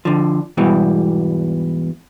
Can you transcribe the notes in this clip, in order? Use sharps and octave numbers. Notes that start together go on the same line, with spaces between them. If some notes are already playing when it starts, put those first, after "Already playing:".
D3 F3
E2 G#2 B2 E3 G3